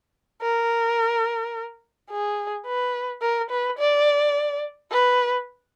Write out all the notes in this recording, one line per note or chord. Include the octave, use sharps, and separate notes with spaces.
A#4
G#4
B4
A#4
B4
D5
B4